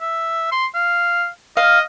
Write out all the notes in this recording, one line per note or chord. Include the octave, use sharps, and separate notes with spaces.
E5
C6
F5
D#5 F5